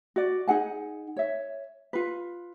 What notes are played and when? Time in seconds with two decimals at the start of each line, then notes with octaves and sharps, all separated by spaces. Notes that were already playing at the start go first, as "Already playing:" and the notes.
0.16 F#4 D5
0.48 D#4 G#4 F#5 G#5
1.16 C#5 E5
1.93 F4 B4